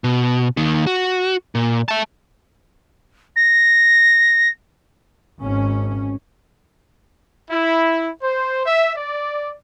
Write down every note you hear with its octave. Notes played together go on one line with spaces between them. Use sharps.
B2
D#2 D#3
F#4
A#2
E5 A5
A#6
G#1 C#4
E4
C5
E5
D5